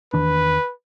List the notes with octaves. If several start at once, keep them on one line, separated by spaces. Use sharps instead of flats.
E2 D#3 D4 B4